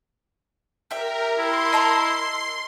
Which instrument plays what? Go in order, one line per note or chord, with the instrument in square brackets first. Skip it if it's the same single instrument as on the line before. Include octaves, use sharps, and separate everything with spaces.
[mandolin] G4 E5 [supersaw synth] A#4
[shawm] E4 [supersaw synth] C6
[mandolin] D#5 A5 A#5